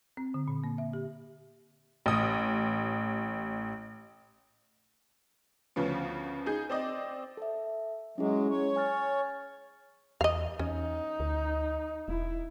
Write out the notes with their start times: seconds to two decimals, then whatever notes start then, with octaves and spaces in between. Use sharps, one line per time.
0.17 C4
0.34 D3
0.48 A#2
0.64 A#3
0.78 E5
0.93 G4
2.06 A1 D#6
5.76 D2 C#3 F3 B3 C#4
6.46 D#4 G#4 G6
6.69 C4 D5 D#5
7.37 A4 E5
8.18 F#3 G#3 C#4 E4 G#4
8.50 C#5
8.76 G#5 F6 A6
10.21 E2 D#5 F5
10.59 E2 C#4 D#4
11.20 D2
12.08 E1 E4